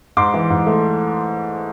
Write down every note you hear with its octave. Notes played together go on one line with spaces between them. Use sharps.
G#2 C6 D6
E3
G#2
A3